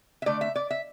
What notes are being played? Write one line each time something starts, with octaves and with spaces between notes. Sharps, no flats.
E5
D3 A3 D5
E5
D5
E5